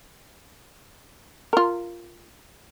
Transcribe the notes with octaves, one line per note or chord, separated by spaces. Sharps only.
F4 A#4